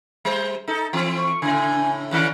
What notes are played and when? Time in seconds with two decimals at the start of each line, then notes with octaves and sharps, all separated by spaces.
0.25 G3 C5
0.68 D#4 A4
0.93 E3 C4
1.17 C#6
1.42 A2 C#3 G#5
2.11 D3 D#3 C#4 F#6